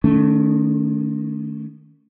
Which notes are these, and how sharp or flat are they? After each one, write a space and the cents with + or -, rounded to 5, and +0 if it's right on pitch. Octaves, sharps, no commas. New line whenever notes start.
D#3 -25 A3 +0 C#4 +25